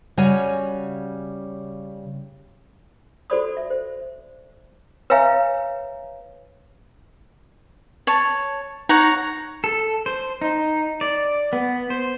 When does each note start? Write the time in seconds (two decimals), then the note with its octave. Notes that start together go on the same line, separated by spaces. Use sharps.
0.17 C#3 G3 F#4 C#5 G#5
3.30 F#4 A4 C5 D5 B5 D#6
3.57 E5
3.71 C5
5.10 B4 C#5 E5 F5 G#5 A#5
8.07 C#5 A5
8.89 D#4 C#5 F#5 A#5
9.64 A4
10.06 C5
10.42 D#4
11.01 D5
11.53 B3
11.90 C5